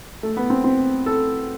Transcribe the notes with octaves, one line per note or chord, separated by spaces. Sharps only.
A3
B3
C4
C4
A4